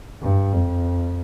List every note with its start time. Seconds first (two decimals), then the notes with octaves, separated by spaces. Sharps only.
0.22 G2
0.52 F2